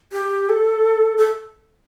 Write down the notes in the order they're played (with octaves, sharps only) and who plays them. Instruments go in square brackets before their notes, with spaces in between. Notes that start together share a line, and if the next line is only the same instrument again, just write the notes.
[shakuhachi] G4
A4
A4